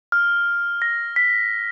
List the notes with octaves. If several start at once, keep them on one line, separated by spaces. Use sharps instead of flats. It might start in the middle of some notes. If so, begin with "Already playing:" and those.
F6
A#6
B6